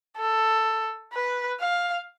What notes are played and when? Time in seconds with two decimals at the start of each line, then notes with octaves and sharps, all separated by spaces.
0.18 A4
1.13 B4
1.60 F5